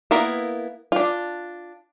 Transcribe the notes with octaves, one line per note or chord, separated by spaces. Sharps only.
A#3 B3 E4 A#4
D4 F4